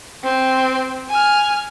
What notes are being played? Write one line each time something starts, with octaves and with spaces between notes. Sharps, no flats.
C4
G#5 F6